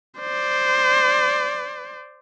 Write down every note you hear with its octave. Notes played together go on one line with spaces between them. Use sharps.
C5 D5